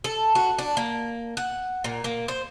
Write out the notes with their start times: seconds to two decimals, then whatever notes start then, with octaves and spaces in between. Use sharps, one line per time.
0.04 A4
0.35 F#4
0.58 D4
0.77 A#3
1.37 F#5
1.84 A#2
2.04 A#3
2.28 C5